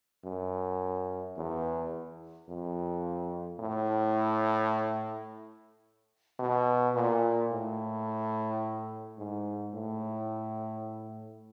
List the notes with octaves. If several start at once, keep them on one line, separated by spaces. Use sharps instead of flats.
F#2
E2
F2
A2
B2
A#2
A2
G#2
A2